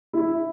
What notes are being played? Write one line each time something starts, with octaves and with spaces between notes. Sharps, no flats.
E4